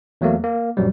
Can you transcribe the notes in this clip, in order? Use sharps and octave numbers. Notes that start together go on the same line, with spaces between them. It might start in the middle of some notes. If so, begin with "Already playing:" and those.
E2 F#3 A3 A#3
A#3
A#1 F#2 F#3 G3